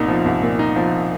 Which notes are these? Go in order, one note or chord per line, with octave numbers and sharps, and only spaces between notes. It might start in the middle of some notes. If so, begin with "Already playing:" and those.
Already playing: C2 A#2 D#4
F3
C2
A#2
D#4
F3